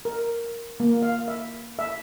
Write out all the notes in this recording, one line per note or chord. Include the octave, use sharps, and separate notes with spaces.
A#4
A#3
F5
E5
E5